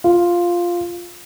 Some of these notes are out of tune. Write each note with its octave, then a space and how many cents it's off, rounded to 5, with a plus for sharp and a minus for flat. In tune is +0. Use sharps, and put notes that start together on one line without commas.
F4 +0